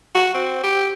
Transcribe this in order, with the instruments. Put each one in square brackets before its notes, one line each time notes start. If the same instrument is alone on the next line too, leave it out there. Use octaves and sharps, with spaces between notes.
[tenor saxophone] F#4
C4
G4